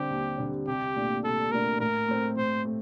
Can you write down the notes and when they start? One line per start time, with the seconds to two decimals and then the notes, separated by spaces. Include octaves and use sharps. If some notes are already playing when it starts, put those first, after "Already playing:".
Already playing: D3 G3 C4 G4
0.10 D#2
0.38 D3 G3 C4
0.67 C2 G4
0.96 A#2 A3 D4
1.24 C2 A4
1.52 A#2 A3 D4 A#4
1.80 A2 A#4
2.08 A3 C4
2.37 A2 C5
2.65 A3